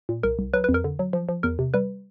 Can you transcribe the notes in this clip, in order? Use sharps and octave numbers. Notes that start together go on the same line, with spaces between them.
A#2
C2 A#4
C2
F#3 B4
B4
F2
A#4
D3
F#3
F3
F3
E2 A#4
C3
G3 B4